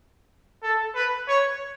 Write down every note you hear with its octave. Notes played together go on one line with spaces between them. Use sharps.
A4
B4
C#5